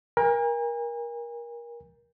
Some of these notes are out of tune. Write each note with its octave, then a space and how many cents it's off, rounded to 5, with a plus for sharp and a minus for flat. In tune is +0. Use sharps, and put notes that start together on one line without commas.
A#4 +25 G#5 -40